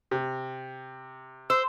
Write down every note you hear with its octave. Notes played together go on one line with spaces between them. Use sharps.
C3
C5 E6